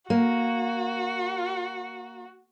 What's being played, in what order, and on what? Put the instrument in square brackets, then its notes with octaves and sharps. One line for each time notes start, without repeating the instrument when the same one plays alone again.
[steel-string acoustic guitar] A#3 [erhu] F#4